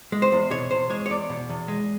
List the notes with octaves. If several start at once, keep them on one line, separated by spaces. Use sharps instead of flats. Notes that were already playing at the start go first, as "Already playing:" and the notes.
G#3
C5
E2
B2 C#5
E2 C5
G#3 C#5
C#5
E2 D5
B2
E2
G#3